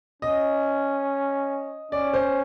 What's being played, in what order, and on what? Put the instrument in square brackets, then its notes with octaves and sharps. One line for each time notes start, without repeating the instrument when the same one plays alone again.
[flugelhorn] C#4 [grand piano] D#5
[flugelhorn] C#4 [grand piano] D5
[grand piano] C5